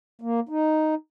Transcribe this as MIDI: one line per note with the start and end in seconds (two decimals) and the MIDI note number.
0.22 0.40 58
0.49 0.95 63